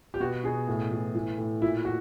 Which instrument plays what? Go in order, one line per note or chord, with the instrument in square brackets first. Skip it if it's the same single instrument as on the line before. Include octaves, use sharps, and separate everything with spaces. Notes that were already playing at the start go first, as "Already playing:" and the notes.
[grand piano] G4
B2 F#4
B2 G#4
A2
E3
E3
A2
A#2 E4
F#4